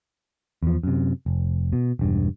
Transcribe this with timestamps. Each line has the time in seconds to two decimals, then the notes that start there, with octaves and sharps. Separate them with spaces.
0.63 E2 F3
0.83 F#2 C3
1.26 F1
1.73 B2
1.99 E1 G2